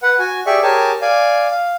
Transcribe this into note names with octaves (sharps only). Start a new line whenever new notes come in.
B4 F#5
F#4 G#5
G4 G#4 D5 E5 C#6
G4 G#4 A#4 C#5 G#5 A5
D5 F5 G#5
F5